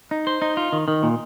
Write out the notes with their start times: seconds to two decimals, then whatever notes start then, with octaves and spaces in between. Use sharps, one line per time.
0.11 D#4
0.27 C5
0.42 D#4
0.57 F4
0.73 D#3
0.88 D#3
1.03 A#2